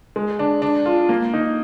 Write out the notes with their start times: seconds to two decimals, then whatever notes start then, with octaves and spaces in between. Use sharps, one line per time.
0.16 G#3
0.39 D4
0.62 D4
0.86 F4
1.09 A#3
1.34 D#4